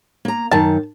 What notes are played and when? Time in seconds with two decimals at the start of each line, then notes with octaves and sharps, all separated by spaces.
0.25 A#3 A#5
0.51 F#2 D#3 A5